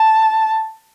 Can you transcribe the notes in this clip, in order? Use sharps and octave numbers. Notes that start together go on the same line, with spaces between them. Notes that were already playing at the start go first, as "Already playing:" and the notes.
Already playing: A5